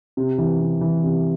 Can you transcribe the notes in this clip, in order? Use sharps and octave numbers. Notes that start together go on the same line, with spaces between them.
C3
E3
C3
E3
C3